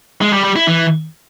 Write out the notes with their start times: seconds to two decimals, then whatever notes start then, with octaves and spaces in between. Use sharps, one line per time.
0.21 G#3
0.33 G3
0.44 G3
0.56 E4
0.67 E3